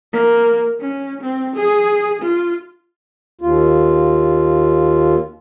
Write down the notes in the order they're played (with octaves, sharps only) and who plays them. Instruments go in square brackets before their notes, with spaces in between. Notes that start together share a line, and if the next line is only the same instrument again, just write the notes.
[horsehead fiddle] A#3
C#4
C4
G#4
F4
[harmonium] D#2 F4